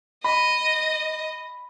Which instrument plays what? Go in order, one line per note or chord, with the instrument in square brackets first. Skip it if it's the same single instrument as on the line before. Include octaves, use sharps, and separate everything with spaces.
[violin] D#5 [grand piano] B5